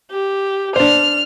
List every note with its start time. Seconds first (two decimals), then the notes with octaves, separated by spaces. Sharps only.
0.12 G4
0.76 D4 C5 F6